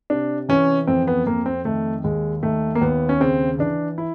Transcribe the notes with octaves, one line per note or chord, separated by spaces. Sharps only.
C3 D4
E3 C#4
F2 C4
B3
F2 A#3
C4
D#3 A3
D#2 G#3
D#3 A3
A#3
D#2 B3
C#4
C#3 C4
E3 D4
E4